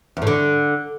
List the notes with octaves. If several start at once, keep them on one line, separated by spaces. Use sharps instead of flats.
E2
A2
D3